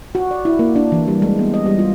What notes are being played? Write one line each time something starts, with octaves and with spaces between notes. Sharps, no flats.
F#4
D5
E4
A#3
D4
E3
G3
G#3
B3
D#5
G3
F4